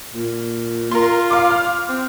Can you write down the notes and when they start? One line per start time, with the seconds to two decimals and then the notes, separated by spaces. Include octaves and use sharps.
0.14 A#2
0.91 F4 A#4 C6
1.30 F5 D6
1.51 F6
1.89 C4